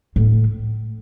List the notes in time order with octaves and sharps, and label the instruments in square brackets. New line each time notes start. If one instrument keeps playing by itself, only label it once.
[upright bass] A2